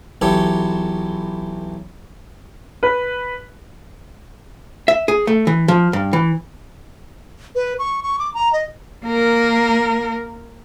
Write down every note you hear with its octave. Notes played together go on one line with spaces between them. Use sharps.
B1 E3 G4 A4 C#5
B4
E5
G#4
A3
E3
F3
G2
E3
B4
C#6
C#6
D6
A#5
D#5
A#3 A#4